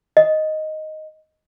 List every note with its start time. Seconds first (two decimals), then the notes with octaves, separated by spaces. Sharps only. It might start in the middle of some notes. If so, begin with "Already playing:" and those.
0.17 D#5